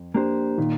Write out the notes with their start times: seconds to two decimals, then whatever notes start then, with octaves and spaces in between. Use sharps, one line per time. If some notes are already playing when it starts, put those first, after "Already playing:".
Already playing: F2
0.15 A#3 D4 G4 C5
0.58 A#2 D#3